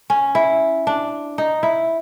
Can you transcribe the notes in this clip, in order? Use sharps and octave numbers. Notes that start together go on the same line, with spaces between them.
C#4
E4
D4
D#4
E4